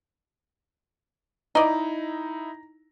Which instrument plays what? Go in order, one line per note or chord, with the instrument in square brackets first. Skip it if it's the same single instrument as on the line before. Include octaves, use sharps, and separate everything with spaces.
[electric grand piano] D#4 E4 [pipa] D5 D#5 [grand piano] A#5